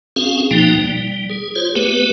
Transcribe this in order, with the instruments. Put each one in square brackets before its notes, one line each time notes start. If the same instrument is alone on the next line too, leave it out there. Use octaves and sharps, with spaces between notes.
[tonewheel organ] C4 C#4 F#4 G#4 F5
B2 F3 A#3 D#4 G5
G3
G#4
F4 G#4 C5 C#5
A3 B3 G4 B4